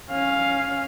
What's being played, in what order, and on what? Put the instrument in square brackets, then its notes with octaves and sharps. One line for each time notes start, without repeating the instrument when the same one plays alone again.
[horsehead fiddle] C#4 F5